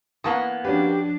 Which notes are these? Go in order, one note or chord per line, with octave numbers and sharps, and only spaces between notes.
E3 A#3 B3 A5 C#6 D#6
F3 C#4 D4 F#4 G4 B4